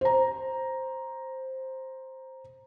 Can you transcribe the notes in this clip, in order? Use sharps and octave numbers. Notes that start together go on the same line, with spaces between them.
C5 A#5